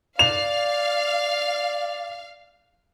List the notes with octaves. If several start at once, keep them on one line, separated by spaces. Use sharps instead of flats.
D5 F5 F7